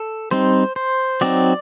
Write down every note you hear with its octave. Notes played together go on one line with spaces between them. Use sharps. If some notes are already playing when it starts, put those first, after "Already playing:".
Already playing: A4
G3 C4 D#4 C5
C5
F#3 C4 D#4 D5